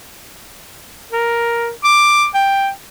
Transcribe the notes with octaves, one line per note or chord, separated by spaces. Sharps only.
A#4
D6
G5